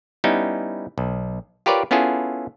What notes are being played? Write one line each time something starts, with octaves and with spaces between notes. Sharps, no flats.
G3 B3 C#4 D#4 E4
B1
F4 G4 A#4 B4 C#5 D5
B3 C#4 E4 F4 G#4 A4